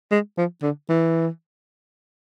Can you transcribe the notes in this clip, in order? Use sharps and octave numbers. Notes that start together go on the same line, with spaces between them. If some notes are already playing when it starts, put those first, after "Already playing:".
G#3
F3
D3
E3